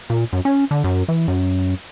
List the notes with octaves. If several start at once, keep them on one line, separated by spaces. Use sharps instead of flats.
A#2
F#2
C#4
D3
F#2
E3
F#2